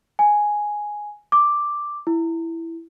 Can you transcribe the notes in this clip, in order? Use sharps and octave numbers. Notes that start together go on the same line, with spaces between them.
G#5
D6
E4